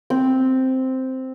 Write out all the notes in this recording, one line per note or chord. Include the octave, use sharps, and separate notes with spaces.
C4